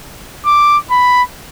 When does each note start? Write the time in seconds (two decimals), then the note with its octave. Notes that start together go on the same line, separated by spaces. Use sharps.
0.46 D6
0.91 B5